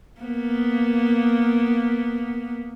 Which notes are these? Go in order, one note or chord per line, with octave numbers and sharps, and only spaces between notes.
A#3 B3